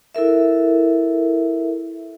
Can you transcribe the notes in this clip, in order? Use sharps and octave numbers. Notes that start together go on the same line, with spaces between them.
E4 A4 A#4 E5